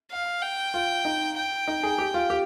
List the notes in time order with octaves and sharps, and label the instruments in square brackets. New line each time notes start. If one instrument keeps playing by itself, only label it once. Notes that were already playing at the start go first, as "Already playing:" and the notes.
[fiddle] F5
G5
[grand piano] F4
D#4
[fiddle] G5
[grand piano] D#4
G#4
G4
F4
G4